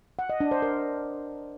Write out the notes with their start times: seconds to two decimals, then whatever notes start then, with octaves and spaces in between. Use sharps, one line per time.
0.19 F#5
0.30 D#5
0.40 D4
0.51 C5
0.62 A#4